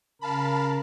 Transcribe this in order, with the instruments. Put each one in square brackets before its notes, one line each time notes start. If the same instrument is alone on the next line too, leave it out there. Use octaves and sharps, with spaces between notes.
[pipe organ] C#3 A#4 [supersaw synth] F5 A5 B5